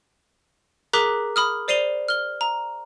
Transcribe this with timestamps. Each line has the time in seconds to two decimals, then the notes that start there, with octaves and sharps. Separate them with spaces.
0.93 G#4 A#4 A#5 D6 F#6 B6
1.36 B5 D#6 F6
1.68 C5 D5 C7 D#7 F7 G7
2.08 F6 G7
2.41 A#5